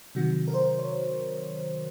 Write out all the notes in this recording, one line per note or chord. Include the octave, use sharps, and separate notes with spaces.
C3 D#3 F#3 F#4
A#4
C5
A#4
C#5